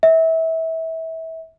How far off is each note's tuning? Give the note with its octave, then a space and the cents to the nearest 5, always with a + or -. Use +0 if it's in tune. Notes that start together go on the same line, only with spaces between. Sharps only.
E5 -25